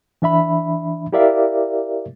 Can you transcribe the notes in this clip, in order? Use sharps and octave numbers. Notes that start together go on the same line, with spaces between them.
E3 D4 E5 B5
E4 G4 A#4 D5 E5 F5